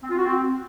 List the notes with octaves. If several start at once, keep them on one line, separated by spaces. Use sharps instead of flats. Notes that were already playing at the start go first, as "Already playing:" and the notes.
C4
F4
F#4
C4